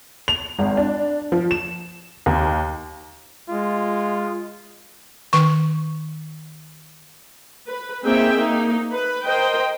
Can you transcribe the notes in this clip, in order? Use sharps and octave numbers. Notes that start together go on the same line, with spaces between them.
F7
G#1
D4
F3
E7
D#2
G#3 F4
D#3 C#6
B4
A#3 C4 D#4 G#4 E5 G5
A#3 D#4
B4
A#4 C5 D#5 G5